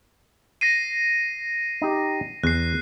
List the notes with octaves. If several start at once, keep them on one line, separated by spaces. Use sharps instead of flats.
A#6 C7 D#7
D#4 G4
E2 F#6 C7